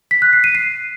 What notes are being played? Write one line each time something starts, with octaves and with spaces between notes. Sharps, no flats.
B6
F#6
C7
D#7
C7